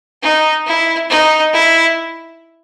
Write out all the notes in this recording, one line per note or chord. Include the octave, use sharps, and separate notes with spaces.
D#4
E4
D#4
E4